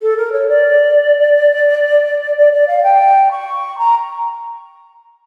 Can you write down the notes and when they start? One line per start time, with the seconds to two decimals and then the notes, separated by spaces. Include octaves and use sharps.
0.02 A4
0.17 A#4
0.32 C#5
0.48 D5
2.37 D5
2.53 D5
2.67 F5
2.83 G5
3.31 C#6
3.78 A#5